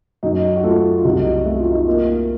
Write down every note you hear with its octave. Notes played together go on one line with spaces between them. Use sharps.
F#2 D#4 F#4
F#4
A3 F4 A4
F4
C2 D#4 F#4
A3 F#4
F4
D#4
A#3 F4